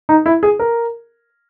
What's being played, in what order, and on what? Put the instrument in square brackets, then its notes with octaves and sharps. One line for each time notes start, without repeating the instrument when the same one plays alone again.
[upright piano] D#4
E4
G#4
A#4